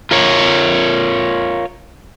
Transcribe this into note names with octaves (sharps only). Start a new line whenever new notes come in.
F4 A#4 C#5